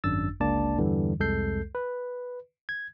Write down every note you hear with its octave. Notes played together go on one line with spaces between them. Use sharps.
G#1 F#2 D4 E6 A6
G1 C#2 A#3 D4 D5 A5
E2 G2 D3 E3 G3
C2 F2 G#3 A4 G6 C7
B4
G#6